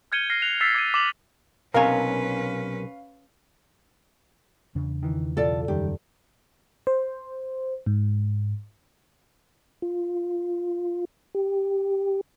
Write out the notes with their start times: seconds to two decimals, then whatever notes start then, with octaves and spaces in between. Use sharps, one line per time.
0.12 F6 G6 G#6 C#7 D#7 G7
0.30 F6 A#6 C7
0.42 F#6 D#7 F7
0.61 E6 A6 B6 C7 E7
0.74 D6 G#6 A#6 D#7
0.94 D6 E7 F#7
1.74 B1 C3 C#4 A#4 B4 C#5 F5 G#5
4.75 E2 C#3 D4
5.03 D#3 E3
5.37 B1 E3 F4 A4 D5
5.68 F#2 D#3 G3 G4
6.87 C5
7.86 G#2
9.82 F4
11.35 G4